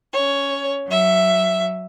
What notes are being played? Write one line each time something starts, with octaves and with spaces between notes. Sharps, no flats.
C#4 C#5
F#3 E5